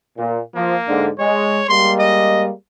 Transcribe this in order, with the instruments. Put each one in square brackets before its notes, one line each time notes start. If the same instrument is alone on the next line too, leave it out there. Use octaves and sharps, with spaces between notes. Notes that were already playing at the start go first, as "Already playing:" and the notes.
[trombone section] A#2
[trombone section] F3 [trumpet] A#3
[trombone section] G#2 D3
[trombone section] G#3 [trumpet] C#5
[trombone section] G3 G#3 A#3 [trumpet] C6
[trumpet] D#5